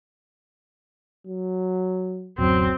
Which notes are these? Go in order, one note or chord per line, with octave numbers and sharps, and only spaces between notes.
F#3
D1 F#2 F#3 C4